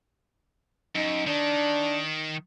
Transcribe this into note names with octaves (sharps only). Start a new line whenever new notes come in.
F#2 D#4
D#3 D4